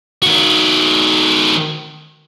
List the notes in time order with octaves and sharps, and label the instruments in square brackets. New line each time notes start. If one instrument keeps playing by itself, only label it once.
[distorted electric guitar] D#3 F#4